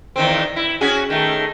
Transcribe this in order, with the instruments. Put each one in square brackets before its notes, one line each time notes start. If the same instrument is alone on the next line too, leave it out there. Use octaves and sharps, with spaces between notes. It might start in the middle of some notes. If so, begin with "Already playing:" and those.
[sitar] E2 D#3 C4
E4
C#4 F#4 G#4
D#3 A3